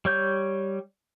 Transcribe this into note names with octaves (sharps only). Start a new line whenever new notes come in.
G3 C#5 G6